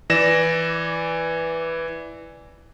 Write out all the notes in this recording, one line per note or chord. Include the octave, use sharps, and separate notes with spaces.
E3 D5 A#6 E7